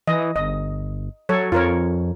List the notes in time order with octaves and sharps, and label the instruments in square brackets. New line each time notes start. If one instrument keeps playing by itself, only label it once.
[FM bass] E3 [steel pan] D#5
[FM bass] G1 [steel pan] D#5
[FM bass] F#3 [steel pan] A4 C#5
[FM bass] F2 [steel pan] F4 A#4 C#5